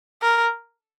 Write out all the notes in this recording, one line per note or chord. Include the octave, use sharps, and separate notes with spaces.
A#4